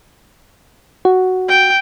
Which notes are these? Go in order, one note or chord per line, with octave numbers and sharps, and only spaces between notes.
F#4
G5